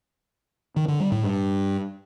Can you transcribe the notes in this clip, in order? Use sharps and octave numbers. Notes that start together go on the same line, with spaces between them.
D#3
D3
G3
A2
G2